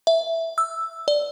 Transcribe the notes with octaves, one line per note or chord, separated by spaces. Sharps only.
E5
E6
D5